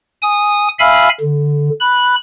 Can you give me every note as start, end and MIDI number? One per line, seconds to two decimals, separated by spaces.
0.22 0.68 80
0.22 0.68 87
0.79 1.09 76
0.79 1.09 77
0.79 1.09 80
0.79 1.09 83
0.79 1.09 88
0.79 1.09 89
1.20 1.69 50
1.80 2.16 83
1.80 2.16 90